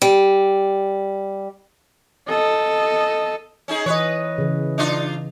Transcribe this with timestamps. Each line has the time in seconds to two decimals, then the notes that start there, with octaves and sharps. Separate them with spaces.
0.02 G3
2.29 A4 D#5
3.68 C#4 D#4 G#4
3.86 E3 B4 C#5 D#5
4.38 C#3 E3
4.78 D4 D#4 F4